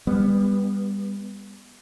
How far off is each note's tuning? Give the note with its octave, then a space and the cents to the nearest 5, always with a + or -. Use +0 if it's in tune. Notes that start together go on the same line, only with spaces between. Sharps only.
G3 +30 B3 +0